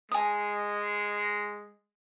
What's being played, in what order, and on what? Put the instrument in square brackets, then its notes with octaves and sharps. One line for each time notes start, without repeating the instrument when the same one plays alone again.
[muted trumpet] G#3 [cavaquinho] G#5 D#6